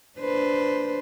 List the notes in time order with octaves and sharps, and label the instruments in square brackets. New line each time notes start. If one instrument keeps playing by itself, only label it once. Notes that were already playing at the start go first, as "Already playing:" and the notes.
[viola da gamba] D4 B4 C5